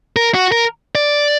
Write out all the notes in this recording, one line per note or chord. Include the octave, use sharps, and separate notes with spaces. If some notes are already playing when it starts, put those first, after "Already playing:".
A#4
F#4
A#4
D5